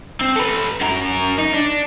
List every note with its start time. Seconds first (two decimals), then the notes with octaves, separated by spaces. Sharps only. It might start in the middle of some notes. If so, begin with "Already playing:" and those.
0.21 C4
0.36 A4 B4
0.81 F#2 A#4
1.38 D#4
1.54 D4